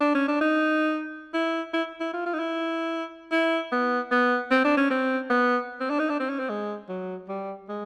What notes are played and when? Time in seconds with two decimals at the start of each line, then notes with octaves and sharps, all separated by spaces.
0.01 D4
0.15 C#4
0.28 D4
0.41 D#4
1.34 E4
1.74 E4
2.00 E4
2.13 F4
2.26 F4
2.34 D#4
2.39 E4
3.32 E4
3.72 B3
4.12 B3
4.51 C4
4.65 D4
4.78 C#4
4.91 C4
5.30 B3
5.81 C4
5.90 D4
5.99 D#4
6.10 D4
6.20 C4
6.30 C#4
6.39 C4
6.49 G#3
6.89 F#3
7.29 G3
7.69 G#3